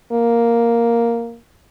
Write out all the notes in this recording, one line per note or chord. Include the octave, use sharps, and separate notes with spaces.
A#3